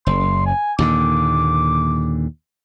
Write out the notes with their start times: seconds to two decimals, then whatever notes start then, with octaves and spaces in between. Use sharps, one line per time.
0.07 F#1 C6
0.47 G#5
0.79 D#2 A#2 D3 D6